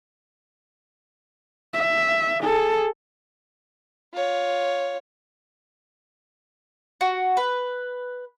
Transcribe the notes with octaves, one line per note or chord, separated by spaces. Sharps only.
E5
G#4 A4
F4 C#5
F#4
B4